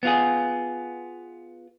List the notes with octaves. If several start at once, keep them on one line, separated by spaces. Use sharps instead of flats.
B3 F4 G#4